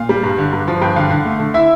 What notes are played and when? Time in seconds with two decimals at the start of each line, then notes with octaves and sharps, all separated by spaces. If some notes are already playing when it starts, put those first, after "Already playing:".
Already playing: A#2 F5
0.09 G3
0.23 G2
0.38 D3
0.53 G2
0.68 F3
0.82 G2 G5
0.96 D3 F5
1.10 D3
1.25 A3
1.40 D3
1.54 E4 E5